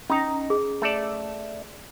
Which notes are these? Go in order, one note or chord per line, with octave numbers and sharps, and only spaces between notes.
C#4 D#4 A#5 D#6
G#4
A3 A4 D5